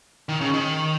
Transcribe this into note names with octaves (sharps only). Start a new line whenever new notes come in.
D#3
C#3
D#3